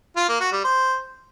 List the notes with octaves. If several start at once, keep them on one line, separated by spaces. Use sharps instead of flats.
F4
A#3
F#4
G3
C5